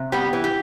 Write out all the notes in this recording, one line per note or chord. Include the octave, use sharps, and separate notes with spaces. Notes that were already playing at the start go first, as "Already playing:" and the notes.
Already playing: C3
G3 B3 G4
E3
G4